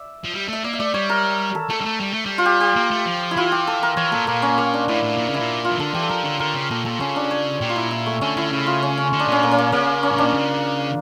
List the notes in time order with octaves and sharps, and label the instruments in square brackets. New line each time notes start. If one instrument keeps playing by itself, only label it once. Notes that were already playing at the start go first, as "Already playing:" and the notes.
Already playing: [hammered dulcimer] D5 E5
[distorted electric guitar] F3
G3
[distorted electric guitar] A3 [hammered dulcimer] E5
[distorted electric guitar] A#3 [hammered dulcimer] D5
[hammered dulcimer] E5
[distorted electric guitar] A3 [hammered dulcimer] D5
[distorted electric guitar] G3 [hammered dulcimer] C#5
[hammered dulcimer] A#4
A4
[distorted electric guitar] A3 [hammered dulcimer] A4
[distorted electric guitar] G3
A3
G3
A3
G3
[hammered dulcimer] F4
G4
G4
[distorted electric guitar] A#3
A3
F3
[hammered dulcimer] E4
[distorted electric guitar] E3 [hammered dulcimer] F4
[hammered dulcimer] G4
A4
A#4
[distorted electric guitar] E3 [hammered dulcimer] C#5
[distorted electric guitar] A#2 [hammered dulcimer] A4
[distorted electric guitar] A#2 [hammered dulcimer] A#3
[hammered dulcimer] C#4
A#3
D4
[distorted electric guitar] A2 [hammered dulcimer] E4
[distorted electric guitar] A2
A#2
[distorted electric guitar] C#3 [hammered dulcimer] E4
[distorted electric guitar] A#2
[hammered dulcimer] F4
[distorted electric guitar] E3
[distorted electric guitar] D3 [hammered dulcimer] A4
[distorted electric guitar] E3 [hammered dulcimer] G4
[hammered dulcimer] A4
[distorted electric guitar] F3 [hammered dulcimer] A#4
[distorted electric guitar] D3 [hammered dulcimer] C#5
[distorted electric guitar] D3 [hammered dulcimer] A#4
[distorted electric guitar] C#3
[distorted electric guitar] A#2 [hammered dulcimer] A4
[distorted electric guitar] A#2 [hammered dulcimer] A4
[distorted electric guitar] C#3 [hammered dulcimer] C#4
[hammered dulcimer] D4
C#5
[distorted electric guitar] A#2 [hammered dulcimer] G4
[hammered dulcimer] F4
E4
E4
A3
[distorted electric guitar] D3 [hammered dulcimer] C#4
[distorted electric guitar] D3 [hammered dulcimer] E4
[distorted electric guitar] C#3
[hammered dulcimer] F4
C#4
C#4
[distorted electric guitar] D3
[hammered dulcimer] D4
[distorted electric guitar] A#2 [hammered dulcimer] C#4
[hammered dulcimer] A#3
C#4
A#3
[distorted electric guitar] C#3 [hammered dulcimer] A#3
[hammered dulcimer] C#4
[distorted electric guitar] A2
[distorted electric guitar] A#2 [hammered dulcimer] D4
[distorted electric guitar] C#3